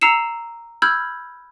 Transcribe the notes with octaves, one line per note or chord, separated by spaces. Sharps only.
A#5 E6 C7 C#7 E7
B5 E6 F6 G6 G#6